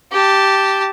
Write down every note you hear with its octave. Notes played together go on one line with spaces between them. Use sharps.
G4 A5